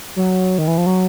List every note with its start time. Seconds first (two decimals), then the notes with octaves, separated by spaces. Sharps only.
0.16 F#3
0.58 D#3
0.67 E3
0.78 F3
0.86 F#3